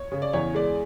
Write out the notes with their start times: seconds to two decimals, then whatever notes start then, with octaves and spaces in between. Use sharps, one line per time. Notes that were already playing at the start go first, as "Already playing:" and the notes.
Already playing: C#5
0.12 C#3
0.22 D5
0.33 E2 C#5
0.55 G#3 D5